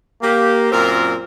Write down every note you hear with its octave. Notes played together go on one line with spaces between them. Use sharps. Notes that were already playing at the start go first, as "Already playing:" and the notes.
A#3 G4
F#2 A#2 C4 A#4